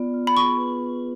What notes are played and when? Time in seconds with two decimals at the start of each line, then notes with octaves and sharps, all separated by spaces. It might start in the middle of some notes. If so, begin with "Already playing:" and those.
Already playing: B3 F4 D5
0.14 F4
0.27 B5
0.36 G#4 C#6
0.57 B4